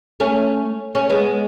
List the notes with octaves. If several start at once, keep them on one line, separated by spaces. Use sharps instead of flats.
A3 C#4
A3 C#4
G#3 B3